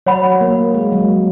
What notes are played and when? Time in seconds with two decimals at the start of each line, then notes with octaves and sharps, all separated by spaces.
0.06 F#3 C#5 F#5 B5
0.41 A#3
0.74 G#3
0.92 F#3